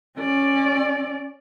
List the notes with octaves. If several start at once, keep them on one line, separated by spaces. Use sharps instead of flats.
C#4 D5